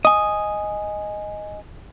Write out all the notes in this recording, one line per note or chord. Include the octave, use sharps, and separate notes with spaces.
D#5 G#5 D#6